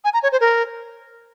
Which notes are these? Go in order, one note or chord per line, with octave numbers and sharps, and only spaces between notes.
G#5
A#5
C#5
C5
A#4